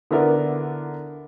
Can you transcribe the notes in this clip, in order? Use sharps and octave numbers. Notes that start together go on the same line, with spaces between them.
D3 B3 E4 A#4 D5